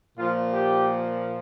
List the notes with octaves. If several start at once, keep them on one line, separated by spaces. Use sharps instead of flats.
A#2 F3 F4
G4